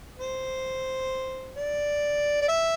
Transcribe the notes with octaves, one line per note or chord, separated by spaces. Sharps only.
C5
D5
D5
E5